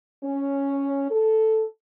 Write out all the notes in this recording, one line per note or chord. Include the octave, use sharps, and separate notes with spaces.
C#4
A4